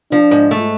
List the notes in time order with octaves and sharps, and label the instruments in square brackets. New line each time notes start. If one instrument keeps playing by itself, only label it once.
[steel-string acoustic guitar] F3 [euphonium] D4
[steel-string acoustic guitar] G#2
A3